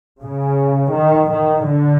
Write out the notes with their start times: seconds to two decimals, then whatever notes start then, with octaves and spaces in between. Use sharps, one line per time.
0.21 C#3
0.94 D#3
1.30 D#3
1.67 D3